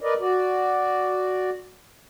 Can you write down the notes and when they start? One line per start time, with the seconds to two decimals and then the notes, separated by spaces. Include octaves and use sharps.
0.01 A#4 B4 D5 D#5
0.20 F#4 D5